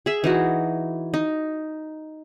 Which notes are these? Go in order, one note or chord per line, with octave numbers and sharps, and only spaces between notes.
G#4 E5
E3 D#4 F#4
D#4